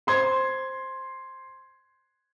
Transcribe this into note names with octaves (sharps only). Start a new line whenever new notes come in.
C5 C6 G#6